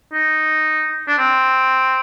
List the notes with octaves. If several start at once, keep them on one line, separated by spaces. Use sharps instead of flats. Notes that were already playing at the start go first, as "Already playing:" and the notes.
D#4
D4
C4